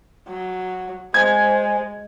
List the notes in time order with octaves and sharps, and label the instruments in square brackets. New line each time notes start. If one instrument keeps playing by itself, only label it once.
[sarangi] F#3
[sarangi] G#3 [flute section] C5 G#5 [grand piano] G#6